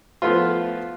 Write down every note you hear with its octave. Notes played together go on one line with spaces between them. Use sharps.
F3 A3 B3 F4